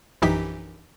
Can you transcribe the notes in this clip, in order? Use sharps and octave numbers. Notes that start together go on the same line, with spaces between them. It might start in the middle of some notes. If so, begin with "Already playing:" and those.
A#1 F#2 E3 D#4 G4 B6